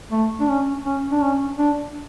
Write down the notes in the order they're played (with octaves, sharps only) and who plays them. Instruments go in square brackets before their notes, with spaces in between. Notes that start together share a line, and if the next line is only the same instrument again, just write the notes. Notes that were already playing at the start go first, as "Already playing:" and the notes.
[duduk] A3
D4
C#4
C#4
D4
C#4
D4